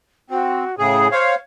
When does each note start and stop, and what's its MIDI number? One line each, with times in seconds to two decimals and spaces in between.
0.30 0.64 60
0.30 0.75 66
0.78 1.08 45
0.78 1.08 49
0.78 1.08 68
0.78 1.10 80
1.11 1.33 72
1.11 1.35 73
1.11 1.35 77